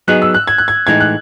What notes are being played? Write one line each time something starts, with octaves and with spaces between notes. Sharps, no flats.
F#3 B3 D#4 G#4 F#6
E6
F#6
G#6
F#6
G#6
A2 E3 G#3 D#4 G#6
F#6